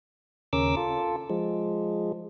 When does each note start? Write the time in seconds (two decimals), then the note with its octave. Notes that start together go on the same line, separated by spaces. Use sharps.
0.53 D#2 C#3 C#4 A#4 D6 E6
0.77 F4 A4
1.30 F3 G#3